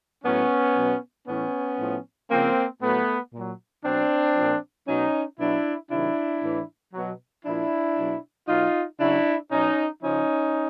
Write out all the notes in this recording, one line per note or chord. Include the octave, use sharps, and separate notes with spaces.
A2 F#3 B3 C#4
B2 F#3
A2 E3 B3 C#4
A2 F3
C#3 F3 A#3 C4
A2 F#3 A3 B3
A#2 F#3
B2 F#3 C4 D4
A#2 F3
B2 F#3 C#4 D#4
B2 F#3 D4 E4
C3 D#3 F#3 D4 E4
A2 E3
B2 F#3
A#2 F3 D4 E4
B2 F#3
B2 F#3 D#4 F4
C#3 F#3 D4 E4
B2 F#3 C#4 D#4
C#3 F3 C#4 D#4